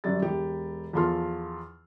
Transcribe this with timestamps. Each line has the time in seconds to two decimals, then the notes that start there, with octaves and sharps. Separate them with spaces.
0.04 F#2 D3 G3 D5 A6
0.22 E1 G4
0.93 E2 F3 F4 A4 C6 F6